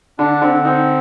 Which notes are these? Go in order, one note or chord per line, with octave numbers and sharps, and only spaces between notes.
D3 D4
D3 C4
C4 D#4